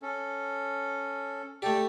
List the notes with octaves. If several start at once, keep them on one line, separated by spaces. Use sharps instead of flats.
C#4 A4
A3 G4 A4 D5